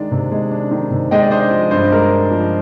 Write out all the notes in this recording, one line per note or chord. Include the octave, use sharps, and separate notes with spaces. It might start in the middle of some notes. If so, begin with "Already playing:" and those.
Already playing: D#3 G#3 D4
C3
G#3
D4
D#3
C3
G#3 D#5 G5
D5
D4 C5 D#5
F3
G2 C5
G#3 A#4
D4
F3